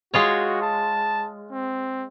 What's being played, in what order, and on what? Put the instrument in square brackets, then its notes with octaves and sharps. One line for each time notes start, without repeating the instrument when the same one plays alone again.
[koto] G#3 F4 C#5 [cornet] F#4
[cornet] A5
C4